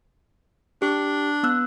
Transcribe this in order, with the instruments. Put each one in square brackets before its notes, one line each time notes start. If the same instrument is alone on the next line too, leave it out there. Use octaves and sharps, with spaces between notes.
[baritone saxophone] D4 [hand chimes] G4
[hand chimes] B3 E6 F#6